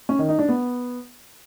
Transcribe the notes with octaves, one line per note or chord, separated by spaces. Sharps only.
C#4
D#3
D#4
D4
B3